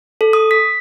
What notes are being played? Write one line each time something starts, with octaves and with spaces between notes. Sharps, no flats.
A4
D#6
B6